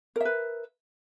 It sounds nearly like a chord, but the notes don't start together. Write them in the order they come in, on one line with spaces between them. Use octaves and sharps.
A#4 E5 B4